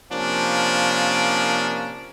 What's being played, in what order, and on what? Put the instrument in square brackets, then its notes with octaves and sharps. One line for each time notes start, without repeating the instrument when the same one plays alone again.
[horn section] C3 F3 A#3 C#4 D4